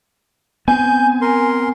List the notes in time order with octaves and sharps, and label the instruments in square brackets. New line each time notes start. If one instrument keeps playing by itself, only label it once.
[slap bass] B3 C4 [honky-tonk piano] G#5 [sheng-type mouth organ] G6
[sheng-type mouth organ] A#4 C6